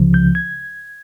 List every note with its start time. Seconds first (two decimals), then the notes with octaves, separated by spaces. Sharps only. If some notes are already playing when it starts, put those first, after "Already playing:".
Already playing: C#2 C#3 F3
0.14 G6
0.35 G#6